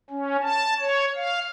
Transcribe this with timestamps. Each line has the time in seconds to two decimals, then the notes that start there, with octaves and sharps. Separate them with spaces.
0.10 C#4
0.43 A5
0.80 C#5
1.16 F5